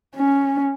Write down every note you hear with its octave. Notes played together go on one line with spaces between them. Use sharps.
C#4